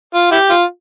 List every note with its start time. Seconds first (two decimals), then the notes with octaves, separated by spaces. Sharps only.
0.15 F4
0.32 E4 G4
0.50 F4